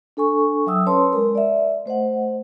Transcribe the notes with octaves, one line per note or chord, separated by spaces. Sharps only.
D4 A4 G#5 C#6
F#3 E5 G5 D#6 E6
C#4 B4 C#5 A5 C6
G#3 A#4
D5 E5
A3 C5 D#5 F#5